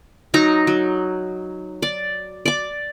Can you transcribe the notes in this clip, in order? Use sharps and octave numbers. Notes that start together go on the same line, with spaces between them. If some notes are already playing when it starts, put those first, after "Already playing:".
F#3 D#4 A#5
F#3
D5
D5 D6